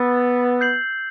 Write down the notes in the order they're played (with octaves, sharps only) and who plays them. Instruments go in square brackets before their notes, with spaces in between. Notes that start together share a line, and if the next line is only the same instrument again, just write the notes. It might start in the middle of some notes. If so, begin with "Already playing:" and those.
Already playing: [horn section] B3 [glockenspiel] E6 A6
[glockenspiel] G6 C7 F#7